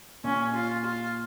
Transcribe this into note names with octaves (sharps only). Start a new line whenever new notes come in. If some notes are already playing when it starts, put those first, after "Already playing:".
A#2 C#4
F4
F4